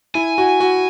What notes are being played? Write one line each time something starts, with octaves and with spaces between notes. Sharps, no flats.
E4 G#5
F#4
F#4